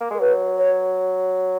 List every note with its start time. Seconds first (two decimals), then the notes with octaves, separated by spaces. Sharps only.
0.01 A#3
0.10 G#3 A#4
0.20 F#3 B4
0.57 C#5